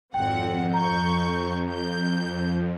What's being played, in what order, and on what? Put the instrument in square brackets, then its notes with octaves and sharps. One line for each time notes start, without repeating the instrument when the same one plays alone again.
[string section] G#1 C4 F#5 [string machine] F2 [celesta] G5
[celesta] A#5 [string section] C#6 G6
[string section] G6